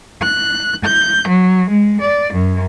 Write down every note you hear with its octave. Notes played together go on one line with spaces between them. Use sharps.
F#6
G6
F#3
G#3
D5
F#2